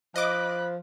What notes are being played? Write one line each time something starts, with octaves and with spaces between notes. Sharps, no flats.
F3 D#5 B5 D6 F#6